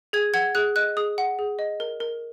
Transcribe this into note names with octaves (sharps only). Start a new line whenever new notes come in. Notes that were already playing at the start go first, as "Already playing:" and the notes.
G#4 G#6
F#5 G#6
G#4 F#6
D#5 F#6
G#4 D#6
F#5
G#4
D#5
A#4
A#4